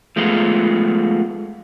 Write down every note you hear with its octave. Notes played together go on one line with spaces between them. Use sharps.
F3 G#3 A3 B3 F4